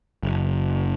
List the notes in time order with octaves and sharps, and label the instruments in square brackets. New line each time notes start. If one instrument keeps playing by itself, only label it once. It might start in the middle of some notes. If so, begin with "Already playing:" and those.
[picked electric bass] F#1